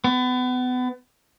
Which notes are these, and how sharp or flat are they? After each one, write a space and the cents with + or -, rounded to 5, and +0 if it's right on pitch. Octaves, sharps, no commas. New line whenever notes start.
B3 +30